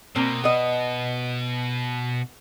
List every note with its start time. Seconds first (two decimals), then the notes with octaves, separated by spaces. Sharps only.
0.16 B2 A#3 C4
0.44 B3 D#5